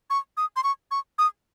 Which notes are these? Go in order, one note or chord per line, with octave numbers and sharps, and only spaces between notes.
C#6
D#6
C6
C#6
C#6
D#6